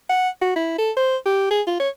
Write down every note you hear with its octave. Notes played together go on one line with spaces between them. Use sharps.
F#5
F#4
E4
A4
C5
G4
G#4
F4
C#5